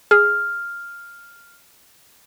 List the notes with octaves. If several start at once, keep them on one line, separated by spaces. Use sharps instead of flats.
G#4 F6